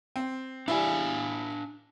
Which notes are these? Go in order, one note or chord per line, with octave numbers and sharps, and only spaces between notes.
C4
G3 D4 E4 F5 G#5